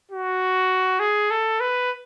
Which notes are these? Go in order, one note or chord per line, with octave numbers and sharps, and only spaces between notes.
F#4
G#4
A4
B4